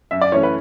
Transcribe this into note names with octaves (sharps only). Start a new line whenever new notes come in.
F#2 E5
D5
E3 A3 C#4 C#5
B4